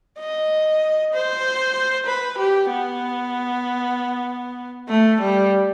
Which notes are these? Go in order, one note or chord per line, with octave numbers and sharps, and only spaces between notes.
D#5
C5
B4
G4
B3
A3
G3